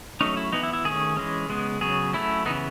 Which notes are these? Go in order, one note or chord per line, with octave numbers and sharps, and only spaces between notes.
F#3 A3 C#4 D#4
E4
E3 B3 D#4
E4
E4
D#3 A3 C#4 G#4
E3 G#3 C#4
C#3 G#3 B3
C#3 F#3 B3 G#4
F#3 A3 C#4 E4
C#3 E3 B3 D#4